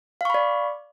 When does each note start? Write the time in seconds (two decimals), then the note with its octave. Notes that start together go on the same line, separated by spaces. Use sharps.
0.21 F5
0.25 C#6
0.30 B5
0.34 D5